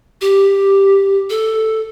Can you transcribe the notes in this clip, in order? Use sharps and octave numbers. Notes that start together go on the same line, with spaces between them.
G4
A4